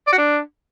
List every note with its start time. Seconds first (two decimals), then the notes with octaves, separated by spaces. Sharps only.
0.07 D5
0.12 F#4
0.18 D4